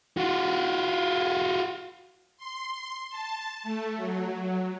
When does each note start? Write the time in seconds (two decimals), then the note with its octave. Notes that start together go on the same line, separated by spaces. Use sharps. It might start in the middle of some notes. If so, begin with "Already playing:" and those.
0.17 F4 F#4
2.37 C6
3.10 A5
3.63 A3
3.96 F#3